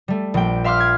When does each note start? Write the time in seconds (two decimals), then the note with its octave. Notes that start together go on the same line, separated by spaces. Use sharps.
0.08 G3 A3
0.34 A#1 G5
0.64 E5 F5 C6 D6 E6 F6
0.80 G#6